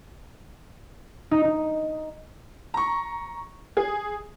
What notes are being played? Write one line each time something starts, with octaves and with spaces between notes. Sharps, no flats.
D#4
D#4
A#5 C#6
G#4